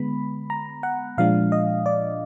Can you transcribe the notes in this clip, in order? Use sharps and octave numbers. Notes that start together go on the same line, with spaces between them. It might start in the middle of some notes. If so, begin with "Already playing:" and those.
Already playing: D3 G#3 B3 B5
A#5
F#5
A#2 F3 G#3 D4 F5
D#5
D5